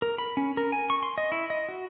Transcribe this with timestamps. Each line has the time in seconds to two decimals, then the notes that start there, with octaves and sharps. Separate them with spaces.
0.02 A#4
0.18 B5
0.37 C#4
0.57 A#4
0.72 G#5
0.90 C#6
1.03 C6
1.18 D#5
1.32 E4
1.50 D#5
1.69 F#4